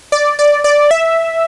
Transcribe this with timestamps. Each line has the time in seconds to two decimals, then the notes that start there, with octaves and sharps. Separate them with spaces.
0.12 D5
0.39 D5
0.64 D5
0.91 E5